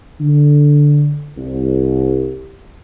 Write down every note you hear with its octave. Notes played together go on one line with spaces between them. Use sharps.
D3
C2